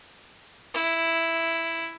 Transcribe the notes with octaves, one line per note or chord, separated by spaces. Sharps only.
E4